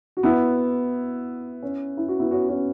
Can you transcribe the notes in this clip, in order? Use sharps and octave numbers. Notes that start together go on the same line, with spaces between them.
F#4
B3 E4
C#4
E4
F#4
B3 E4
C#4 F#4
C#4 F#4